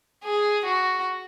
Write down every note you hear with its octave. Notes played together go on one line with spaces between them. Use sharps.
G#4
F#4